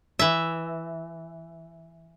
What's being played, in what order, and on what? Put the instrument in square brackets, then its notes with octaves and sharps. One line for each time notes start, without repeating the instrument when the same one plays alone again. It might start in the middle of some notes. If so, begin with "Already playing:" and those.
[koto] E3 E5